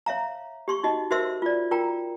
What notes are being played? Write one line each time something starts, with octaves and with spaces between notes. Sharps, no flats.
C#5 E5 F5 A#5
G4 C6 C#6
D#4 F#4 D#5
F#4 A#4 C5 E5 C6 E6
F4 D5
F4 A#4 G5 A#5